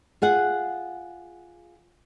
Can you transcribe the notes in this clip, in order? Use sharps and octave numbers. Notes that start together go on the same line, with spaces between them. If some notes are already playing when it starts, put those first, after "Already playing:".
F4 G#4 F#5